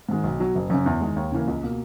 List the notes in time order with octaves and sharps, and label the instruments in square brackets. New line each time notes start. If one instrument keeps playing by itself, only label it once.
[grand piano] G#2 D#3 G#3
B1
B2 F#3
F#1
F#2 C#3
E2
D#3 G#3
D#2
C#3 E3 A#3
C#2
B2 A#3